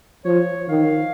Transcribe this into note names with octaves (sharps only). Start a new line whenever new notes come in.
F3 C#5
D#3 F5